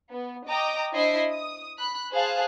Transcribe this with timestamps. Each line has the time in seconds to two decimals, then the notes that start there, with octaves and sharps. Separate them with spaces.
0.11 B3
0.48 D#5 G5 A#5 D6 D#6
0.93 D4 E4 C5 D#5 E5 C7
1.32 D#6
1.78 B5 F#6
2.12 G#4 C5 F5 A5 F#6